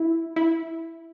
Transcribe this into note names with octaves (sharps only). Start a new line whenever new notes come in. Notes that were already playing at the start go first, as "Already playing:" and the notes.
Already playing: E4
E4